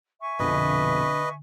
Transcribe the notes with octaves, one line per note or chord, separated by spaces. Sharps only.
E5 G#5 C#6
A#1 F2 B2 D3 B4 D#5